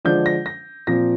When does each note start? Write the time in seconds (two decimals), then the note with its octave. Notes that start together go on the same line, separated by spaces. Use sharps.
0.05 D3 F3 G#3 D4 G6
0.26 A#6
0.46 A#6
0.87 A#2 F3 C4 A#6